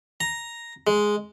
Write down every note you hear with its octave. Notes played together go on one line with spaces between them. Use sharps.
A#5
G#3